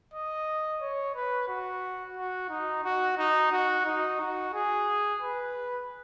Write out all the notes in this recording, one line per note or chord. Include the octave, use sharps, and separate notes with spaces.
D#5
C#5
B4
F#4
F#4
D#4
F#4
D#4
F#4
D#4
F#4
G#4
B4